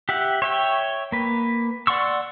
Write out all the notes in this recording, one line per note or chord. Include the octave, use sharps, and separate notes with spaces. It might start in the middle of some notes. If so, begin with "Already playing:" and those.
G4 E5 F#5
C#5 E5 G5
A#3 B4
D5 F#5 C6 C#6 E6